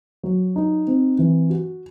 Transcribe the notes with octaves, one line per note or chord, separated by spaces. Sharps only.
F#3
D#4
C4
E3
F#4